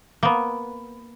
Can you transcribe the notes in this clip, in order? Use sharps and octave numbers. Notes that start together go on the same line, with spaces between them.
A#3 B3